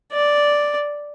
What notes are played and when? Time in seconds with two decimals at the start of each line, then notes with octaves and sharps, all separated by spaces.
0.13 D5